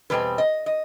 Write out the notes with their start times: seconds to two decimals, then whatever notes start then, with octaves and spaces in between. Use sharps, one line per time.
0.10 E2 B2 G3 C4 B4
0.38 D#5
0.66 D#5